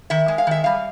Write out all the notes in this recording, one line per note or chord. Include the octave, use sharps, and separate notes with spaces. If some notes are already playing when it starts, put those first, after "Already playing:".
D#3 E5
G#3
F5
D#3 E5
G3 F5